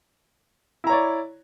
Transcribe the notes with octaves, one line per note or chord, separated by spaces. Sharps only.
E4 C#5 D5 A#5